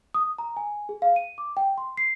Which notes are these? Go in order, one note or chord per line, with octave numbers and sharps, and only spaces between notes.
D#6
A#5
G#5
G#4
F5
D#7
D6
G5
C6
C7